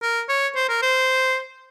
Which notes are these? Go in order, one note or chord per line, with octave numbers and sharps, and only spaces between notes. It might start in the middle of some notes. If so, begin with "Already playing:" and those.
A#4
C#5
C5
A#4
C5